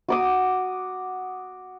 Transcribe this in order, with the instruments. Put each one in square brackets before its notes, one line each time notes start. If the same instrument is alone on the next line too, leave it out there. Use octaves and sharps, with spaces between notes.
[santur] F#4 D6 D#6